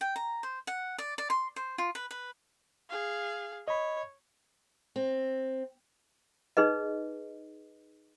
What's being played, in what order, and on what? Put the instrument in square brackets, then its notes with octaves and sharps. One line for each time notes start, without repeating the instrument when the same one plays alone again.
[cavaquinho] G5
A#5
C5
F#5
D5
D5
C6
C5
F4
B4
B4
[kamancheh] G#4 F5
[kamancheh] C#5 [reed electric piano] D#5 B5
[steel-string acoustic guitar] C4
[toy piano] D#4 G#4 B4 D#5